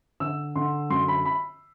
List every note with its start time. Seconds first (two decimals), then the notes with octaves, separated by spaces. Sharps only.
0.20 D3 E6
0.56 D3 C6
0.90 F#2 C6
1.08 B5
1.25 B5